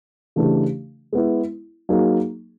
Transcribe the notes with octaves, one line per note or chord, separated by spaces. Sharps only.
C#3 E3 A3 D4 G4
G#3 B3 E4
F#3 A#3 D#4 G#4